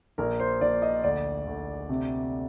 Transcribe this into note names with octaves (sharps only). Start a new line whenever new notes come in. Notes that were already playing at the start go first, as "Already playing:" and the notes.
A#1 A#4
C5
A#1 D5
D#5
D2 D5
D2
C3